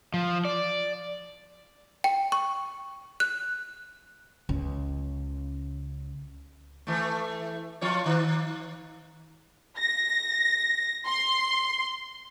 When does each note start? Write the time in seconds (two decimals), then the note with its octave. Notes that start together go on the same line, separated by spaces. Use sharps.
0.14 F3
0.45 D5
2.04 G5
2.32 C#6
3.20 F#6
4.49 C#2 C#3
6.87 E3 A3
7.81 F3 F4 C#5
8.06 D#3
9.78 A#6
11.06 C6